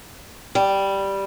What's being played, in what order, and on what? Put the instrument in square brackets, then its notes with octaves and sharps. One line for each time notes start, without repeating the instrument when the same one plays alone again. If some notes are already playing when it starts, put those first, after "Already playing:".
[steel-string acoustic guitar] G3